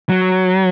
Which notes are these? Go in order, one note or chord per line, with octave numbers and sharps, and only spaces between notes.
F#3